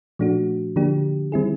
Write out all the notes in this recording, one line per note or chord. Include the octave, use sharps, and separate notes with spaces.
A#2 F3 A3 D4 F#4
D3 F3 A#3 D4 G4
D#3 G3 C4 E4 G#4